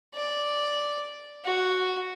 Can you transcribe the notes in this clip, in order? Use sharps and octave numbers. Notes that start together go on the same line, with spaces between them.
D5
F#4